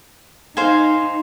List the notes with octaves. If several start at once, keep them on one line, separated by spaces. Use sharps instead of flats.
D#4 C5 F5 G#5